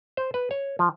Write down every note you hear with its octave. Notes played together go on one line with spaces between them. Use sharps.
C5
B4
C#5
F3